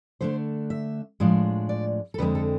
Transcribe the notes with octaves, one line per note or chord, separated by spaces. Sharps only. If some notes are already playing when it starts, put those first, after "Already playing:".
D3 A3 D4 C5
E5
A2 F3 G#3 D4
D5
A4
F2 D3 G#3 C4 B4
A4